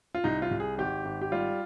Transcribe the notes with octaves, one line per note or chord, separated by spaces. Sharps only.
F4
C2 D#4
F4
C2
G#4
G#1 G4
G#1
G4
G3 F4